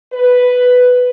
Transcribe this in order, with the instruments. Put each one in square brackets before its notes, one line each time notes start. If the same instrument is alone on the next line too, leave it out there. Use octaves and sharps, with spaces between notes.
[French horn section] B4